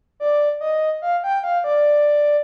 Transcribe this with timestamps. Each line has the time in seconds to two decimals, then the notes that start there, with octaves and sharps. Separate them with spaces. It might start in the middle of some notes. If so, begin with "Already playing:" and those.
0.20 D5
0.61 D#5
1.02 F5
1.24 G5
1.44 F5
1.64 D5